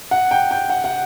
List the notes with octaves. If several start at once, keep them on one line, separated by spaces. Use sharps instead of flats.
F#5
G5
G5
F#5
F#5